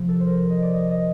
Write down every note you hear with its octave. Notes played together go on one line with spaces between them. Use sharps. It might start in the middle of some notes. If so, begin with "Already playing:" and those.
Already playing: C3 F3
A4
C5
A#4
C5
D#5
D5
D#5
D#5